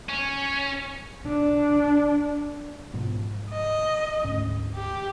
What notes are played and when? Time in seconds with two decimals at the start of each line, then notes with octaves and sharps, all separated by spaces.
0.09 C#4
1.27 D4
2.94 G#2 B2 F3
3.51 D#5
4.24 D2 G#2 C#4
4.75 G4